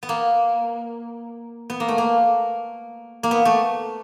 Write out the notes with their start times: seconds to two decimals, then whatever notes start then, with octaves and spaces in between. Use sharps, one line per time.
0.03 B3
0.09 A#3
1.70 B3
1.80 A#3
1.88 A3
1.98 A#3
3.23 A#3
3.31 B3
3.45 A3